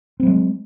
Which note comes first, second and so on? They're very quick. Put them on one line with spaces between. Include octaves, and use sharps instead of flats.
C4 F#3 G#3